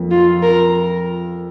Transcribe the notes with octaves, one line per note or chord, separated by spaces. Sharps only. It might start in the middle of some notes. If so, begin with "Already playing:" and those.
Already playing: F2 F3 A#3
F4
A#4